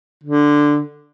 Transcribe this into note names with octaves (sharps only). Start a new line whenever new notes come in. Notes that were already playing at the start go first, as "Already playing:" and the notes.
D3